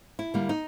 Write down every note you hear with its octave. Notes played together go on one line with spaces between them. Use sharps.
E4
D3 G3 A#3
D#4